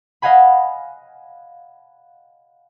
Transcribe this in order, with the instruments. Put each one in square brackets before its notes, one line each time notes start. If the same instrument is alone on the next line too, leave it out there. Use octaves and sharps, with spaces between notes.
[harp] D#5 F5 F#5 G#5 B5